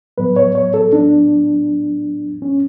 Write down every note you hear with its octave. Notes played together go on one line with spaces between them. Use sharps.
A2 F#3 B3 B4
C#5
C#5
A4
D4
C#4